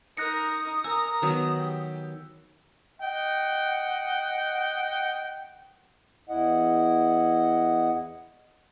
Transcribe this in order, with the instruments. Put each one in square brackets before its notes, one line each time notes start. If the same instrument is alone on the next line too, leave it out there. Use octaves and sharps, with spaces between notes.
[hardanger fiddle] D#4 A#4 [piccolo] D#6 [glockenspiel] F#6 A#6 C#7
[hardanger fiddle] A#4 A#5 [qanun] G#5 [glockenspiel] E6
[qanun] D#3 F#3 B3
[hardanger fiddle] G4
[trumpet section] D#5 F#5 G5
[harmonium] E2 E4 D#5 F#5